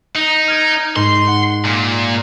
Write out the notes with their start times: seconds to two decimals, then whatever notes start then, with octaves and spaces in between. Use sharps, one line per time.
0.16 D#4
0.48 F6 G#6 D7
0.96 G#2 C6
1.27 F#5
1.64 A#2